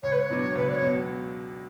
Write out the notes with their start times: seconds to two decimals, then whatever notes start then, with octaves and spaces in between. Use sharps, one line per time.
0.03 C#2 C#5
0.12 B4
0.20 C#5
0.30 B2 F#3 B3 D4
0.55 C#2 B4
0.69 D5
0.74 C#5
0.81 B2 F#3 B3